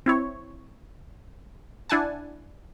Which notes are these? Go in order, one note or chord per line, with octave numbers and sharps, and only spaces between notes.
C4 E4 C#5
D4 E4 F#5 G#5 A5